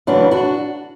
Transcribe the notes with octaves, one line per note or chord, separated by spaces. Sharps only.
F#2 C#3 E3 D4 F#4
D4 F#4